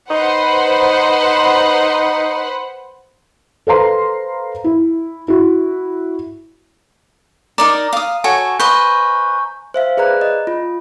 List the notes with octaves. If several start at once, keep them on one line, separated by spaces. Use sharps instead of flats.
D#4 B4 C5 F#5
A4 B4 C5 F5 A#5 C6
E4
E4 F#4
D#4 A#4 D5 A#5
F5 D#6
F#4 A4 C#5 G#5
B4 C5 D#5 C#6 G6
C5 E5 F5
G#4 B4 D5 A#5 F#6
D#5
F4